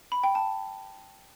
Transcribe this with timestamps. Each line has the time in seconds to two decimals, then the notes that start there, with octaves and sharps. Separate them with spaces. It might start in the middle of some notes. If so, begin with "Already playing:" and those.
0.12 B5
0.23 G5
0.35 A5